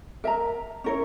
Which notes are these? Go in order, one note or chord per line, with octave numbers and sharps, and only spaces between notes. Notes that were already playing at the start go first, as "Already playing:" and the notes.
A#4 E5 A#5
C#4 E4 A#4 C#5